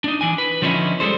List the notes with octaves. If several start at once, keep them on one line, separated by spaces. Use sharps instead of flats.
D4 D#4
E3 D4 G#5
B4
D3 F3 B3 C#4 D#4 E4
G3 G#3 A4 C5